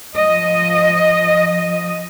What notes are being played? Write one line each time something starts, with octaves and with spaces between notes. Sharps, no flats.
F3 D#5